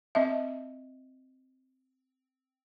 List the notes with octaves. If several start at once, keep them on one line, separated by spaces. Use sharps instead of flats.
C4 D#5 E5